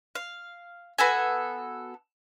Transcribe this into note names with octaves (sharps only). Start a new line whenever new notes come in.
F5
B3 F#4 A4 G#5